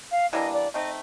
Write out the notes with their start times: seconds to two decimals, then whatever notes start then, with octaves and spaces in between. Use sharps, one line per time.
0.11 F5
0.32 E3 G3 A#3 D4 D#5
0.53 D5
0.74 A3 C4 D#4 D#5